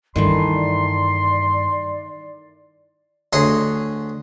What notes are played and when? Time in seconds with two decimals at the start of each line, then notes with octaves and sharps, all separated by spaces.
0.16 G2 D#3 E3 A3 D5 C6
3.33 D2 G#4 C#5 D#5 C6 C#6